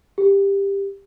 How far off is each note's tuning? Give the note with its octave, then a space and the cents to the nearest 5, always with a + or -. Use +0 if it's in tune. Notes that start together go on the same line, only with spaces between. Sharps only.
G4 +15